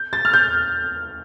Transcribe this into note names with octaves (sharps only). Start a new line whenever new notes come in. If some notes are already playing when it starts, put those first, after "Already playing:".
Already playing: G6
A6
F6
G6